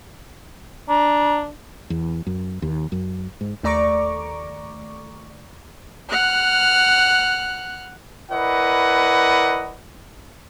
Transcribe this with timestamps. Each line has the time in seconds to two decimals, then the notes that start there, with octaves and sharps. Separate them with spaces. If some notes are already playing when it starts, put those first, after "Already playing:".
0.89 D4 A#5
1.90 E2
2.27 F#2
2.62 D#2
2.92 F#2
3.41 G#2
3.63 D#2 A3 D5 A#5 C#6 D6
6.08 F#5 F6 F#6
8.32 E4 A#4 B4 D5 D#5 F#5